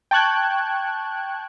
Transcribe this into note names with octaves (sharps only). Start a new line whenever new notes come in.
G5 A5 C#6 F#6 G#6